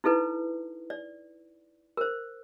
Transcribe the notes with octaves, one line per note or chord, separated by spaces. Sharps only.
D#4 E4 A4 B4
D5
A#4 C5